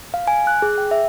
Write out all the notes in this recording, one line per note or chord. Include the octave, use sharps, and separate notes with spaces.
F5
G#5
F#6
G#4
G5
E5